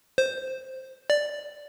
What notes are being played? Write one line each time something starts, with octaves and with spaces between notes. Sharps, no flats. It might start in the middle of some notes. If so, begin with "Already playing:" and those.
C5
D5